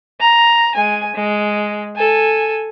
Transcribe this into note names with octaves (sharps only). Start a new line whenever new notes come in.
A#5
G#3 G#5
G#3
A4 G#5